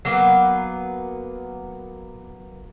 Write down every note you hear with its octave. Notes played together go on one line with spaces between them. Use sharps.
F#3 A#3 B3